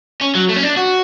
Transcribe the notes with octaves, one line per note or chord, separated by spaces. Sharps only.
C#4
F#3
A3
C#4
D4
F#4